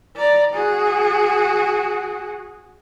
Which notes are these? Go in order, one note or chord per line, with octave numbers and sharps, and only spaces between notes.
D5 A#5
F#4 G#4